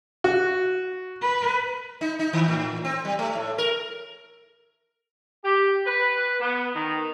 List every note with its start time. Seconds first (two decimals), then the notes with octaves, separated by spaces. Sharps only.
0.24 F#4
1.22 B4
2.01 D#4
2.19 D#4
2.33 D#3
2.48 A2
2.85 C4
3.05 G3
3.19 A3
3.35 A2
3.58 A#4
5.44 G4
5.86 B4
6.40 B3
6.75 D#3